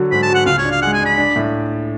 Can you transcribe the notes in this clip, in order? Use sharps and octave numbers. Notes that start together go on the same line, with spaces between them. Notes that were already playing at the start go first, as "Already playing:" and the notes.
Already playing: D3 F#3 F#4
G#2 B5
A5
F#4
F#5
C#2 F5
C#5
D4
F5
G#3 F#5
G#5
D4 B5
D4
A2